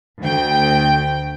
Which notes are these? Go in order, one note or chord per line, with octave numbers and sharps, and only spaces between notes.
D2 G5